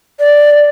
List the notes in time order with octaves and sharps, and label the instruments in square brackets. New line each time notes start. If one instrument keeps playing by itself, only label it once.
[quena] D5